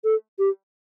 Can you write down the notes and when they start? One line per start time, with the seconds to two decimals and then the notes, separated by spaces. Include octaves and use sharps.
0.04 A4
0.39 G4